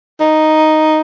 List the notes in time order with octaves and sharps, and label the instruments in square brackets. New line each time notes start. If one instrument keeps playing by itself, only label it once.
[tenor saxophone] D#4